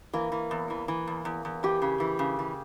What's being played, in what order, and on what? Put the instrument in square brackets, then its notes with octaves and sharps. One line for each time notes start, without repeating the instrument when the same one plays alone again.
[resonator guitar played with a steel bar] E3 [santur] A#3
[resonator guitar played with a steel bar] E3
E2
E3
E3
E2
E2
E2
[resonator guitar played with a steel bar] E3 [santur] G4
[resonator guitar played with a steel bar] C#3
E3
C#3
E3